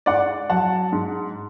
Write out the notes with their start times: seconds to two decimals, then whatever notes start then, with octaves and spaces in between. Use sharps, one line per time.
0.06 G#2 D5 F#5
0.50 F#3 F#5 A5
0.92 G#2